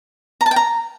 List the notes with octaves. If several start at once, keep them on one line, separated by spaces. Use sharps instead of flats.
A#5
A5
G5
A#5